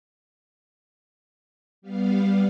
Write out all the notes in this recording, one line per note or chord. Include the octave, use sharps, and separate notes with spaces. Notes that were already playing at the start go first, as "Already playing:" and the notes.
G3 B3 F5